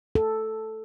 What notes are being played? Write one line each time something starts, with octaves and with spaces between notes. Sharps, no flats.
A4